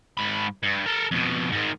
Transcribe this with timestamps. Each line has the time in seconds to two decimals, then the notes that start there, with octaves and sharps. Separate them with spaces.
0.17 G#2 B5
0.63 G2
0.86 A4 A#4
1.11 F2 B2
1.52 G#2 D#3